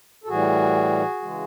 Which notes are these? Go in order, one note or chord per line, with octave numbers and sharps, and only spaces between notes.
A4
A2 E3 G3 F#4 G#4
C#3 E3 G#3